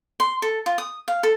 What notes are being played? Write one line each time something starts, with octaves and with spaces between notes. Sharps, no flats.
C6
A4
F4
D#6
F5
A4